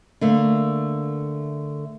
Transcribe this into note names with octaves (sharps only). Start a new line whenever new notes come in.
D3 A3 A#3